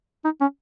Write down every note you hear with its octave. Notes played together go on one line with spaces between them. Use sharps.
D#4
C#4